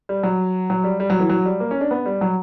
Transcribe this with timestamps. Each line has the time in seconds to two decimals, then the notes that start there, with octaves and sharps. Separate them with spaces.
0.09 G3
0.23 F#3
0.70 F#3
0.84 G3
1.00 G3
1.10 F#3
1.20 E3
1.29 F#3
1.46 G3
1.60 A#3
1.71 C#4
1.81 D4
1.91 B3
2.06 G3
2.21 F#3